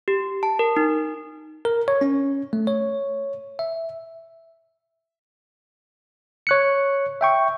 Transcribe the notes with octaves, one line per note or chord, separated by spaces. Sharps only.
G4
A5
A#4
D#4
A#4
C#5
C#4
A3
C#5
E5
C#5 F#6 C#7
E5 G5 C#6